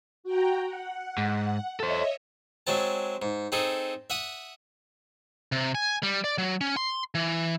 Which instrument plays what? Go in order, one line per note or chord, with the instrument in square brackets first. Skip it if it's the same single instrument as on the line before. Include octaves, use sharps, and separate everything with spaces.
[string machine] F#4 G5 A#5
F#5
[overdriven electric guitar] G#2
[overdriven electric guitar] A4 C5 [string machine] C#5 D#5 E5
[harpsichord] F#3 G#3 C4 A5
G#2
C4 D#4 G#4 A4
E5 F#5 D#6
[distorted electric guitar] C3
G#5
G3
D5
F#3
C#4
C6
E3